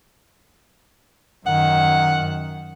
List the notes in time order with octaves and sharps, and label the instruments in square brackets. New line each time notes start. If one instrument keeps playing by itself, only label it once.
[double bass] F#2 D#3 [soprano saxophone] F#5